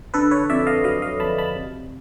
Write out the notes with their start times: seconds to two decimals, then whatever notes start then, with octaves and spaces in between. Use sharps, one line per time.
0.14 D3 A4 B4
0.31 B4 C#5
0.50 F2 D5 E5
0.67 D#5 F5
0.84 F#3 D#5 F5
1.02 D#5 F5
1.20 F2 A5 B5
1.38 A5 B5
1.56 C3